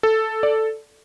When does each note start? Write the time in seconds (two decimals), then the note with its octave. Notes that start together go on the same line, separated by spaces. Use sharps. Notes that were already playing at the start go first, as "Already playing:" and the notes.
0.03 A4
0.43 D5